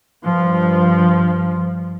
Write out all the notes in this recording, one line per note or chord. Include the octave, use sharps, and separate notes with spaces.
G2 F3